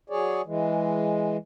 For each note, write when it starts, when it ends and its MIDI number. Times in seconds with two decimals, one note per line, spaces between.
0.10 0.42 54
0.10 0.42 68
0.10 0.42 73
0.10 0.42 74
0.46 1.37 52
0.46 1.37 56